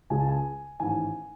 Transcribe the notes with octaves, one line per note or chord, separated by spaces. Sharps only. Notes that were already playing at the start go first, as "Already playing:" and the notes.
C#2 C#3 G#3 G#5
A5
G#5
A1 G#2 D#3 G#5